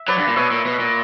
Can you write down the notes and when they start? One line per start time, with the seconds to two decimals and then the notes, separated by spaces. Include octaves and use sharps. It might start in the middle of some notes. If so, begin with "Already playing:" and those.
Already playing: E5
0.08 F#3 B4 D5
0.18 G2
0.27 A#2
0.36 B2 C#5 E5
0.51 A#2
0.66 B2
0.79 A#2